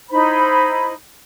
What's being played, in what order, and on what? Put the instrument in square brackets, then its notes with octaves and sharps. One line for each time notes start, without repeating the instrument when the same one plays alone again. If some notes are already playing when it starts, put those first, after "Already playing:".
[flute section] D#4 E4 C5 B5